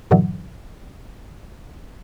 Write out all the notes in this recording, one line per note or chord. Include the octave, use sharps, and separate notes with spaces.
G2 A#2 D3 E3 F#3